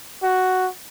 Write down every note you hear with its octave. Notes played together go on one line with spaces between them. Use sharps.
F#4